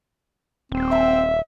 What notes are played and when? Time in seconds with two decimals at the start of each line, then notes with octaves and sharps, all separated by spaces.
0.72 D#1 C4
0.91 E5